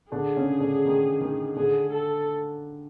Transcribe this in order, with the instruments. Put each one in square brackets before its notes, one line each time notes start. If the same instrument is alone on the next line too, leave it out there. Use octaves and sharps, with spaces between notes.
[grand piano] D3 D4 [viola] G#4
[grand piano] C#3 C#4
D3 D4
D#3 D#4
D#3 D#4
[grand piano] D3 D4 [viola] G#4
[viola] A4